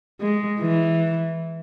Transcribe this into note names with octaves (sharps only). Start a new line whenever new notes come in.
G#3
E3